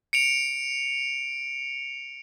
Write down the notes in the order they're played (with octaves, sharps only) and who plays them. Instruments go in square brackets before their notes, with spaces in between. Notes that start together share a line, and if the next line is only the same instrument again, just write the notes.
[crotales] C#7 D7 F7